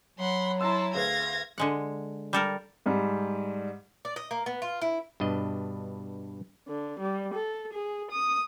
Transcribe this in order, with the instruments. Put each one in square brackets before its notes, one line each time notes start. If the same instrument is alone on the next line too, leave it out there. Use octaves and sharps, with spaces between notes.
[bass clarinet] F#3 [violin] F#5 C6 [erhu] B5
[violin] E4 A5 [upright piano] A#5 E6 [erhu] C6
[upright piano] D2 G#4 B4 [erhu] F5 [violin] G#6 A#6
[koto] D3 G#3 F#5
G3 A4 A#4
[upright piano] G#2 G3
[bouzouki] D5
D#5
A#3
B3
F4
E4
[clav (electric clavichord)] G2 B2 D4 D#5
[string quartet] D3
G3
A4
G#4
D#6